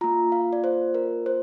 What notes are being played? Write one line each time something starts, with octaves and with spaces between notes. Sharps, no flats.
A#3 F4 A#5
F5
D5
C5
A#4
C5